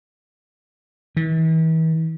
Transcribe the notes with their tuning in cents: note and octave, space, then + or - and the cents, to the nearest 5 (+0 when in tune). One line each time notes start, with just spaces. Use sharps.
E3 -40